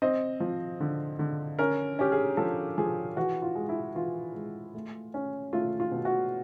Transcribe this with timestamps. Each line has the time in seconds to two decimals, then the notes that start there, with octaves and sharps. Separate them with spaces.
0.02 C4 D#5
0.40 F3
0.80 D3
1.19 D3
1.59 C#4 A#4
1.99 C#4 G4
2.12 G#4
2.37 F3 A4
2.78 F3 G#4
3.16 E3 F#4
3.42 F4
3.55 G#3
3.69 E4
3.95 E3 F4
4.34 G#3
4.75 A3
5.14 C#4
5.53 A3 F4
5.80 F4
5.92 B2
6.05 F#4